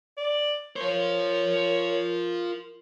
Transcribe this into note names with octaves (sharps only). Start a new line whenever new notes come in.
D5
F4 A#4 C5 C#5